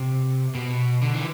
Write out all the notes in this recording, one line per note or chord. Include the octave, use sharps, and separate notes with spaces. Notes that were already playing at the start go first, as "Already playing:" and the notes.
Already playing: C3
B2
D3
E3